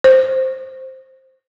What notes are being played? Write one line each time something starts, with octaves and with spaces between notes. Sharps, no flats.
C5